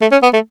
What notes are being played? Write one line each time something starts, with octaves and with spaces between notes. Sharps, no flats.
A3
C#4
B3
A3